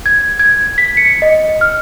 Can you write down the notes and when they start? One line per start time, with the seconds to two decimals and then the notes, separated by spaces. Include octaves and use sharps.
0.06 G#6
0.39 G#6
0.78 B6
0.97 C#7
1.22 D#5
1.61 F6